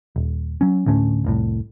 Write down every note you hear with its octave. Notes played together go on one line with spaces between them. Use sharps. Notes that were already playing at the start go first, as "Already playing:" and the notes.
D#1
F#3 C#4
D2 A2 A3 C#4
F1 C2 A2